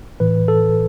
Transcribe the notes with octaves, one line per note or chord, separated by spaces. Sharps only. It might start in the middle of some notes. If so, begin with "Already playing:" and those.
A2 E3 B4
A4